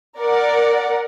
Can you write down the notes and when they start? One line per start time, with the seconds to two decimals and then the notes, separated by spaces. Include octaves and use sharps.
0.19 A#4 D5 F#5